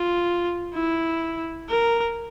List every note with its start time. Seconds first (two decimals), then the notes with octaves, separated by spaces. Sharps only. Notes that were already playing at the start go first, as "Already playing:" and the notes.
Already playing: F4
0.74 E4
1.69 A#4